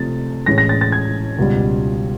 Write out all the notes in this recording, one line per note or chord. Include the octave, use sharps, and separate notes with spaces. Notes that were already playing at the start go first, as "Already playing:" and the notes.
Already playing: C3 F3 A3 A6
A2 E3 G#3 C#4 A#6
A#6
A6
A6
G#6
C#2 B2 G3